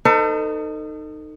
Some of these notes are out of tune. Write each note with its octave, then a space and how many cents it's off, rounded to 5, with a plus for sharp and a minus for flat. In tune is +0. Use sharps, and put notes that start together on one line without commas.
D#4 -15 A4 +35 C5 -45